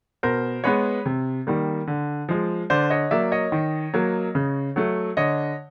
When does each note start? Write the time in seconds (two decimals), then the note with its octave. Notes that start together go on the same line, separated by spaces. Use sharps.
0.23 B2 A#4 C5
0.64 G#3 B3 B4 C#5
1.06 C3
1.47 D#3 G3 A#3
1.87 D3
2.29 F3 G#3
2.70 D3 C5 D5
2.90 C#5 D#5
3.11 F#3 A#3 D5 E5
3.32 C#5 D#5
3.52 D#3
3.94 F#3 A#3
4.35 C#3
4.76 F#3 A3
5.17 D3 C#5 D#5